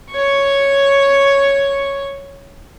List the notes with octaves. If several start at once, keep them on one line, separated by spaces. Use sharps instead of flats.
C#5 C#6